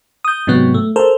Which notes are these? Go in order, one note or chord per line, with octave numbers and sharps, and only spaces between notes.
D#6 G6
G#2 C3 F#3 B3
A3
A4 A#4 C5